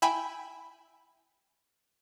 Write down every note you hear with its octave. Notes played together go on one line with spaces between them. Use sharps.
E4 E5 G5 G#5 B5